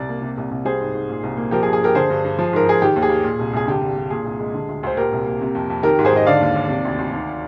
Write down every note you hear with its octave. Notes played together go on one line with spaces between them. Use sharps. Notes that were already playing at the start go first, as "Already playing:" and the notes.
Already playing: C2 D5
A#3
C3
C2
C2
G3 G#4 C5
G#2
G#2
A#2
C2
A#3
F3 G4 A#4
G#4
G2
G#4
G2 G4 A#4
D3 G#4 C5
G2
G2
F3
G#2 A#4
G#2 G#4
D#3 G4
D#2
G#4
A#3
A#2
C2
C2 G#4
D3 G4
G2
G2
A#2 G#4
C2
G#3
D3
D2
D2 C5
A#2 G4 A#4
C2
A#3
C3
F2
F2
D#3 G4 A#4
G#2
G#4 C5
G#2 D#5
D3 D5 F5
D#2
D#2
C3
D2
D2
D#3